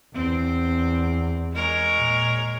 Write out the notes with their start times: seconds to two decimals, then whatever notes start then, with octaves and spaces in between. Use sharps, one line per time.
0.14 E2 C4
1.53 G#3 A#4 C#5
1.95 A#2